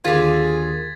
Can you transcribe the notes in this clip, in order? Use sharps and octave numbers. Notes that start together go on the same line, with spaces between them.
D#2 D3 F4 G#4 G#6 A6 B6